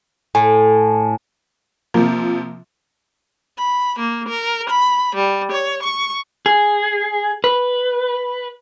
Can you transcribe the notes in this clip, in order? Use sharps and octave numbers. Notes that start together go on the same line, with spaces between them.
A2 G#5
C3 F3 A#3
B5
A#3
A#4
B5
G3
C#5
C#6
G#4
B4